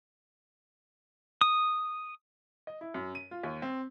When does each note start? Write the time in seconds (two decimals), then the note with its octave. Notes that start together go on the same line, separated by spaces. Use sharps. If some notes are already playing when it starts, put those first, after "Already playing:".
1.41 D#6
2.67 D#5
2.81 E4
2.94 F#2
3.15 D#7
3.31 F4
3.43 D#2
3.62 C4